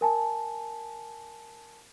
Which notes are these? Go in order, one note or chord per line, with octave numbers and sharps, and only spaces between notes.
A#4 G#5 A5